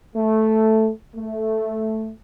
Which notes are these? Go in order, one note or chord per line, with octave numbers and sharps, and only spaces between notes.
A3
A3